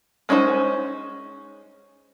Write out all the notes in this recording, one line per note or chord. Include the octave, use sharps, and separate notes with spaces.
G#3 C#4 D#4 A#4 C5